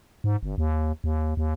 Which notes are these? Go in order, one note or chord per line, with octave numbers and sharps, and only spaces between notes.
G#2
G1
D#2
D#2
D#2